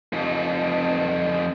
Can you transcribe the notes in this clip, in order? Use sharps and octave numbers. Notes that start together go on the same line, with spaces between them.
F2 D#4